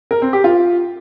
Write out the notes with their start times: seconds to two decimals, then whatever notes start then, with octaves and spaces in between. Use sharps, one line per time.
0.11 A#4
0.22 C4
0.33 G4
0.44 F4